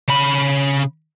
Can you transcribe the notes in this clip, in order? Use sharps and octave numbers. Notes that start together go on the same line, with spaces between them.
C#3 B5